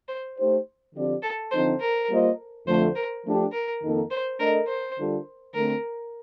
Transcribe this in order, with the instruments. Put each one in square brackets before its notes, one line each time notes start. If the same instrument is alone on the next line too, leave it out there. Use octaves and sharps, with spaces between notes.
[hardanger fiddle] C5
[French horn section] A3 D#4 G4 C5
D3 F3 C4 G4 D5
[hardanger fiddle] A4
[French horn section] D3 F3 C4 D#4 A4 [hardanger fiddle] C5
[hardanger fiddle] A#4
[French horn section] G3 A#3 F4 C5 D#5
[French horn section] F2 D3 F3 A3 [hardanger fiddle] C5
[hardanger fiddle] A#4
[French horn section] F3 A3 D4 G4
[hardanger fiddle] A#4
[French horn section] F2 D#3 A#3 D#4 A4
[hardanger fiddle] C5
[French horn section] A3 D4 A4 D#5 [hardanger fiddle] A#4
[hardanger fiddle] C5
[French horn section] D3 G3 D4 F4 A4
[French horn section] D3 A3 C4 [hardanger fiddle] A#4